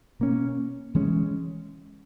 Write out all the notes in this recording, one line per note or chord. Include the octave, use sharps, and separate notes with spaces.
B2 A#3 C#4
E3 G#3 C#4